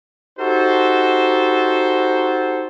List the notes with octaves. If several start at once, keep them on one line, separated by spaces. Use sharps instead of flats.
D#4 F#4 G4 A4 C5